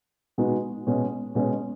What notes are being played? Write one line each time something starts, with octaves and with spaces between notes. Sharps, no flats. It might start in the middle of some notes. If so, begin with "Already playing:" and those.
B2 G#3 B3 D#4 F#4
B2 G#3 C#4
B2 G#3 C#4